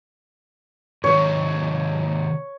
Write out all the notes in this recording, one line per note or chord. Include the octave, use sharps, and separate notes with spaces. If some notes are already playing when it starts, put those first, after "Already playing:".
G#2 C3 D#3 C#5